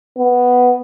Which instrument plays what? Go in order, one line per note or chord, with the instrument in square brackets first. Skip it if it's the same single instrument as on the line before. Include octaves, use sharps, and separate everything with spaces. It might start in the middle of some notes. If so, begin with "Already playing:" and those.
[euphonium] B3